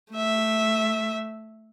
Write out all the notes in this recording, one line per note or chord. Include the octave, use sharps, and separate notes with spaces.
A3 E5